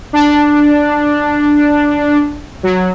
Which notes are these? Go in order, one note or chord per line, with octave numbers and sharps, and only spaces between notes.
D4
F#3